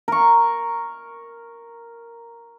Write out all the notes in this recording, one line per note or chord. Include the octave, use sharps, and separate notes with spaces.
A#4 C#6